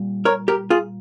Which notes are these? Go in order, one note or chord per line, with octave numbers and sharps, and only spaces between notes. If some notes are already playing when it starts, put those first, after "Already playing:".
Already playing: A#2 G3
A#4 C#5
G4 A#4
F4 G#4